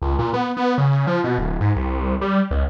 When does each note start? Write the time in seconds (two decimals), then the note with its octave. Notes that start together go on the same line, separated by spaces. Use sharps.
0.02 C#2
0.19 A#2
0.33 B3
0.57 B3
0.78 C#3
1.07 F3
1.24 B2
1.38 D1
1.61 G#2
1.76 C2
2.21 G3
2.51 C#2